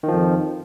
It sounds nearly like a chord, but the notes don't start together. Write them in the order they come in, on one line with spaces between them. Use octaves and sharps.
D#3 F3 F2